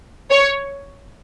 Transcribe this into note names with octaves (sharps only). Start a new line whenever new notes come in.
C#5